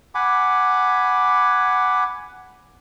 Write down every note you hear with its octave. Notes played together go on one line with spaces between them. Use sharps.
F#5 G#5 B5 D6